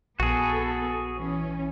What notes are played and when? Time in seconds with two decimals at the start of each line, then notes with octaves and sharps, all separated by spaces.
0.20 A#1 B3 F#4 G#4 A4
1.16 E3 C#4